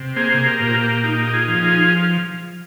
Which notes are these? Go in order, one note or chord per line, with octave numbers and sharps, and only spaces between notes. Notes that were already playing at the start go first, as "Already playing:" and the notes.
Already playing: C3
A#3 G#4 C5
G4 A#4
A#2
F4
G4
D#4 G4
G4
F4 G#4
F3
F4 G#4